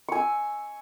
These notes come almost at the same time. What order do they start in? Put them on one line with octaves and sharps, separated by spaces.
C#6 G#5 E6